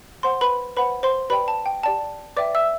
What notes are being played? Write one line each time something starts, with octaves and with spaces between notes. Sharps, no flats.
C5 F#5 C6
B4 B5
B4 C5 F#5 B5
C5 C6
G4 B4 D5 G5 B5
A5
G5
G4 D5 G5 A5
B4 D5 E5 G5 D6
E5 E6